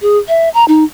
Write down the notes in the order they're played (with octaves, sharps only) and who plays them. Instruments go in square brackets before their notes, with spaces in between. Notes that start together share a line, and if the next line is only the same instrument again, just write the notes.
[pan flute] G#4
E5
A#5
D#4